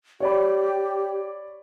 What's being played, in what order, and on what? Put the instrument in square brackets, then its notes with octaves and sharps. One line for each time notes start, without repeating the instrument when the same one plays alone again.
[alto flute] G4 [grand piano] C#5 D5 B5